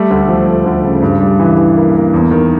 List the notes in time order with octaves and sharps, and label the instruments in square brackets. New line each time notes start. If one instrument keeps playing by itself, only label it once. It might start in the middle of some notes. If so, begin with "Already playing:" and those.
Already playing: [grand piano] G3 A3
D2
F3
D2
D2
C#3
G2
G3
E3
E3
A#3
A#3
E2
D#3